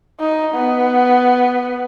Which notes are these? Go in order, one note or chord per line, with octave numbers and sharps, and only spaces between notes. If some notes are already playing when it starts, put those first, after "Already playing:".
D#4
B3